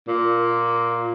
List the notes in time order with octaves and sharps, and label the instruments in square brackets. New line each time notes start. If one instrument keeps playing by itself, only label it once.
[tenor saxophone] A#2